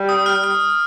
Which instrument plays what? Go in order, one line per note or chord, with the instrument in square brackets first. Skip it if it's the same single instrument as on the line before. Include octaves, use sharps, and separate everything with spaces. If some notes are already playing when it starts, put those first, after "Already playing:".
Already playing: [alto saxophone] G3
[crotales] D#6
F6
F6